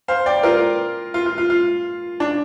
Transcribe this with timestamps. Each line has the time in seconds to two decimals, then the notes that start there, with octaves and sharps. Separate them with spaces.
0.08 C5 F5
0.26 D5 G5
0.43 F4 A#4
1.14 F4
1.26 F4
1.38 F4
1.50 F4
2.20 D4